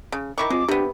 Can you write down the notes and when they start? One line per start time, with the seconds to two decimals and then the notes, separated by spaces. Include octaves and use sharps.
0.12 C#3
0.38 D#3 E4 C#6 D6
0.50 G#3 C4 F4
0.69 C3 B3 D4 G4